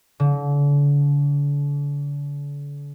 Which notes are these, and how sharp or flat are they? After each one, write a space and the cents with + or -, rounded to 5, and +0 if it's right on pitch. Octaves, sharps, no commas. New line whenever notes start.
D3 -40